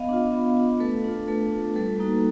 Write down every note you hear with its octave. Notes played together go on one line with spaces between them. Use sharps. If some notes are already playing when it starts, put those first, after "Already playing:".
Already playing: B3 D#5 F5
D4 F4
B3
D4 F4
A3 A4 B4
D4 F4
A3 A4 B4
D4 F4
G3 A4 B4
A#3 D#4 F#4